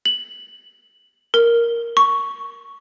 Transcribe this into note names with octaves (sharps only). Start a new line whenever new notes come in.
F#7
A#4
C#6